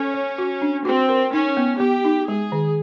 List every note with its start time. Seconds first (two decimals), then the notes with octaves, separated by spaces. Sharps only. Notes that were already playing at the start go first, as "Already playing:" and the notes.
Already playing: C#4 A4
0.14 C#5
0.38 F#4
0.62 D4
0.85 C4 F#4
1.09 A#4
1.32 C#4 D#4
1.57 B3
1.80 B3 G4
2.05 D#4
2.28 G#3 G#4
2.52 D#3